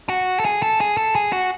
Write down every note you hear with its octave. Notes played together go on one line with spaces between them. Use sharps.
F#4
A4
G#4
A4
G#4
A4
G#4
F#4